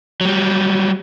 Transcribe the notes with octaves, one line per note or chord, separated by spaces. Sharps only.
F#3 G3